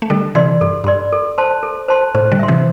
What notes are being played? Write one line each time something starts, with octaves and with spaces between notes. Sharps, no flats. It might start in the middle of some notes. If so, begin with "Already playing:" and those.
A3
D3 G3 A4
C3 E3 D5 C6
G2 A4
G2 D5 C6
A4
C5 A5 C6
A4
C5 A5 C6
A2 C5
D3 G3
E5 C6
C3 E3